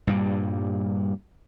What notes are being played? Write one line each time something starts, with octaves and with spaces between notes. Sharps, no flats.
G2 A#2 G3